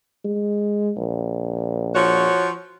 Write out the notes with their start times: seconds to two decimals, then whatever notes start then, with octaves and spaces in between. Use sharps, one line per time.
0.25 G#3
0.97 A#1
1.95 F3 F#4 C#5